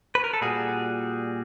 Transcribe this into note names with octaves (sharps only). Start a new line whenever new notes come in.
B4
A#4
A4
A#2 G3 F#4 G#4